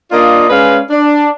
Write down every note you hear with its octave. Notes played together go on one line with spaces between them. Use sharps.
A#3 D4 F4 D5 D#5
G#3 C#4 B4 D5 F5
D4